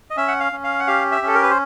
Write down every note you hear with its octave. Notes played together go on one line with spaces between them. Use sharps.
D#5
C#4 E5
F#5
F5
C#4
F5
F#5
G4 F5
E5
C#4 A4
A#4
B4
C5